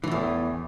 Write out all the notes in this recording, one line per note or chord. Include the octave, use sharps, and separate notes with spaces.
E2 A2 E3